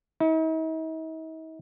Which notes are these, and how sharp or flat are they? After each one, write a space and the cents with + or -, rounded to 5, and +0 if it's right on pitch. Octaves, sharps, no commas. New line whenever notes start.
D#4 +45